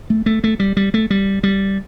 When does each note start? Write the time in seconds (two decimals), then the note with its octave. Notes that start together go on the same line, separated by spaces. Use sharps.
0.10 A3
0.26 A3
0.44 A3
0.60 G3
0.77 G3
0.94 A3
1.10 G3
1.43 G3